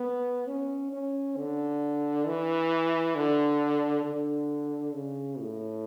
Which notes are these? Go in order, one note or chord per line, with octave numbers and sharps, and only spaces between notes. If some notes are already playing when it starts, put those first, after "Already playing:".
Already playing: B3
C#4
C#4
D3
E3
D3
D3
C#3
A2